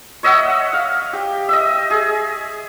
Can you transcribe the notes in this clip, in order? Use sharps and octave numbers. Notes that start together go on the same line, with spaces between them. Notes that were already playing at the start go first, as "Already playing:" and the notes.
C#5 D#5 E5 F#5
F5
G4
D#5 E5
G#4